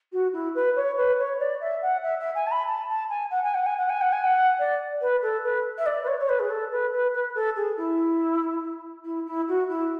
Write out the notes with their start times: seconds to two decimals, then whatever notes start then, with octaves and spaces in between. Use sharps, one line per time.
0.12 F#4
0.33 E4
0.55 B4
0.76 C#5
0.97 B4
1.18 C#5
1.40 D5
1.61 E5
1.82 F#5
2.03 E5
2.19 E5
2.35 G#5
2.46 A5
2.51 B5
2.67 A5
2.89 A5
3.09 G#5
3.31 F#5
3.43 G#5
3.54 F#5
3.66 G#5
3.77 F#5
3.89 G#5
4.01 F#5
4.12 G#5
4.24 F#5
4.59 D5
5.01 B4
5.22 A4
5.44 B4
5.78 E5
5.86 D5
6.03 B4
6.07 C#5
6.19 C#5
6.29 B4
6.39 G#4
6.50 A4
6.71 B4
6.92 B4
7.14 B4
7.35 A4
7.56 G#4
7.77 E4
9.04 E4
9.26 E4
9.48 F#4
9.69 E4